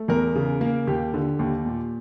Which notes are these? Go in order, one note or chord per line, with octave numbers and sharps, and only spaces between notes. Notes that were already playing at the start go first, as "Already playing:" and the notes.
Already playing: A3
E2 A#4
C#3
A#3
D#2 G4
D3
D#2
A#2